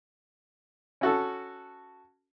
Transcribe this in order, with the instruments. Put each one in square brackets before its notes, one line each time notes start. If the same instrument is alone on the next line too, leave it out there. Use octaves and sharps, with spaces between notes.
[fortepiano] C#4 F#4 A4